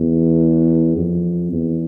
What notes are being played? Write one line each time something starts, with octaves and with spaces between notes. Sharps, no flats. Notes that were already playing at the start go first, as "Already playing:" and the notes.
Already playing: E2
F2
E2